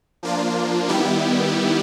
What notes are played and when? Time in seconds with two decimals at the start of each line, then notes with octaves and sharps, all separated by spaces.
0.23 F3 A#3 D4 F4
0.88 D#3 G3 B3 E4 G4